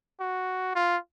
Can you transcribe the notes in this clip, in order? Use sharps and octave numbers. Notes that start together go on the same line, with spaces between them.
F#4
F4